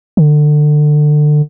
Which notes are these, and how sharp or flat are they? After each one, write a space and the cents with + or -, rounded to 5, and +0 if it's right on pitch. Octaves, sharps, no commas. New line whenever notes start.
D3 +25